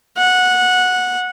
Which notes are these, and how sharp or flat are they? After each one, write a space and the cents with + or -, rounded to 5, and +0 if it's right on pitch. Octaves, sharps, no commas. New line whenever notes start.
F#5 -15